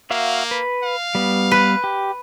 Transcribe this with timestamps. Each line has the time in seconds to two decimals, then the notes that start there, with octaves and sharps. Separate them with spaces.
0.10 A#3 F#4 E5 F5
0.51 B4
0.83 F5
1.15 G3 B3
1.51 B4
1.84 G4